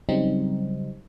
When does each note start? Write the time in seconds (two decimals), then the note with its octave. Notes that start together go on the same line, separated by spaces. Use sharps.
0.09 C#3 F#3 G3 C4 D#4